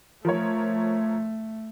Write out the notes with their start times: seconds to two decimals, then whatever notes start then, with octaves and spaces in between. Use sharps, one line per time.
0.25 F3 A3 A#4 C#5